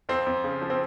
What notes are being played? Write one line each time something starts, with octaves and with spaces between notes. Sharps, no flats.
F2 C4
F2
C#3
F3
C4